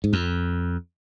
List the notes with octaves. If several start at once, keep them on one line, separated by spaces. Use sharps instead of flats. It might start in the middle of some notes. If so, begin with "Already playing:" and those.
G#2
F2